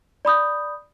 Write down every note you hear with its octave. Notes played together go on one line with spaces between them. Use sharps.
D5 B5 D#6 G6